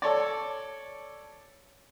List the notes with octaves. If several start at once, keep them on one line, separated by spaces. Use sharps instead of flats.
A4 C#5 D5